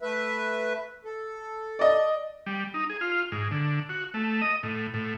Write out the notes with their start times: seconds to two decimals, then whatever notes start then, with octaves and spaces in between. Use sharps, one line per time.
0.02 A3 B4 E5
1.05 A4
1.79 D5 D#5
2.46 G3
2.74 D#4
2.90 G#4
3.01 F4
3.32 G#2
3.51 D3
3.89 F#4
4.14 A3
4.42 D#5
4.63 A2
4.94 A2